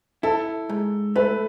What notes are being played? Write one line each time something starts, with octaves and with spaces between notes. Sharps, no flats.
E4 A4
G#2
A3 B4